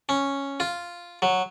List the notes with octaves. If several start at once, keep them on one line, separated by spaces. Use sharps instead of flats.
C#4
F4
F#3